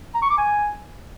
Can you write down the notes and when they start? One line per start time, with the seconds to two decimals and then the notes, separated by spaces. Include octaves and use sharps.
0.14 A#5
0.22 C#6
0.30 D6
0.38 G#5